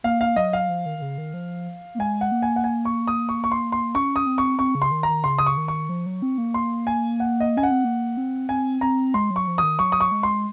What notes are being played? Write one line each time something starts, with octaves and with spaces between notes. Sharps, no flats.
A#3 F5
F5
F#3 D#5
F5
F3
D#3
D#3
C#3
D#3
F3
A#3
G#3 G#5
F#5
A#3
G#5
F#5
G#5
C#6
D#6
C#6
C#6
C6
C6
C#4 C#6
D#6
C4
C#6
C4 C#6
C#3
C6
D#3
A#5
D#3
C#3 C6
D#6
C#6
D#3
C#6
F3
F#3
C4
A#3
C6
G#5
F#5
D#5
C#4 G#5
F#5
C4
A#3
C4
C4 G#5
C4 A#5
G#3 C6
F#3
C#6
F3
D#3 D#6
F#3 C#6
D#6
C#6
G#3
C6